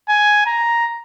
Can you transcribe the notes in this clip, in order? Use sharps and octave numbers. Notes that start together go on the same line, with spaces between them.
G#5
A#5